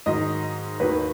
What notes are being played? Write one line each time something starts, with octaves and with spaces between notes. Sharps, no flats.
G#2 D#3 F#3 D#5
D#2 D#3 F#3 B4